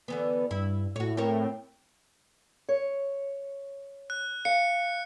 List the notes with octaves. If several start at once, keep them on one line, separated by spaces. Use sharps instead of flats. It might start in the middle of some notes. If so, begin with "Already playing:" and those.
D3 E3 B3
G2 E4
A2 F#4 C#5
C4 A#4 C#5
C#5
F#6
F5 C#7